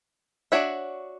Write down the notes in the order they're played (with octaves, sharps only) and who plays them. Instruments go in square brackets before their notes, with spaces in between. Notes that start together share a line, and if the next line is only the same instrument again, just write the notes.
[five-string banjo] D4 F#4 C#5 E5